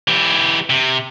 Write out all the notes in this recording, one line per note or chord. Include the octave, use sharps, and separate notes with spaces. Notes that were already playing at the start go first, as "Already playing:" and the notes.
E3 G4
C3